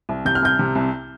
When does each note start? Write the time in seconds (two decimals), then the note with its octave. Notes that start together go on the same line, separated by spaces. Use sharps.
0.09 C2
0.25 C3 G6
0.35 F6
0.42 C2 G6
0.59 C3
0.75 C2